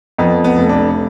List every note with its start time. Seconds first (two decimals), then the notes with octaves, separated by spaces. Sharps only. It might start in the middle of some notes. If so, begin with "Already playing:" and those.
0.18 F2 B3
0.44 B3
0.57 F1
0.69 D4